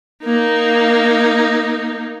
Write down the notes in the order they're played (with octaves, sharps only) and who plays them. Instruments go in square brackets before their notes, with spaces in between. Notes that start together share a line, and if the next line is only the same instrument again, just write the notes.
[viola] A#3 D#4